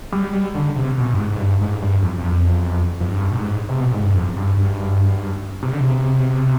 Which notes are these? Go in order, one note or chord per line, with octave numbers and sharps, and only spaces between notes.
G3
G3
D3
C3
B2
G2
G#2
G#2
G2
G#2
G2
F2
F2
F2
G2
B2
G#2
C3
B2
G#2
G2
F2
G2
G2
C3
D3
C3